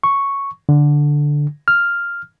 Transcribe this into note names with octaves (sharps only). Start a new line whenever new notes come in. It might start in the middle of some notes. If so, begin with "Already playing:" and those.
C#6
D3
F6